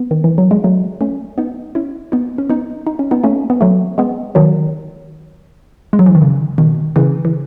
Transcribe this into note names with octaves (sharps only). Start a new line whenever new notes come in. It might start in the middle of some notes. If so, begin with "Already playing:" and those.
Already playing: B3
D#3
E3
F#3
G#3
F#3 A3
A3 C#4
B3 D#4
C#4 E4
B3 D#4
C#4
B3 D#4
D#4
C#4
B3 D#4
A3 C#4
B3
F#3 A3
G#3 B3
D#3 F#3
G#3
F#3
E3
D#3
C#3
B2 D#3
C#3 E3
E3